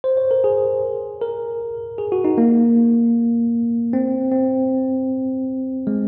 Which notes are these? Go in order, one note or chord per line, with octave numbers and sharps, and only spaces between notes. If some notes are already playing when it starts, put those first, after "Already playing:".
C5
C#5
A#4
G#4
A#4
G#4
F#4
D#4
A#3
C4
C4
G#3